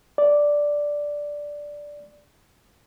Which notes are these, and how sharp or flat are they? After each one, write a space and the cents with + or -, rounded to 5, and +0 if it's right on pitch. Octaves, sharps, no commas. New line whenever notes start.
D5 -5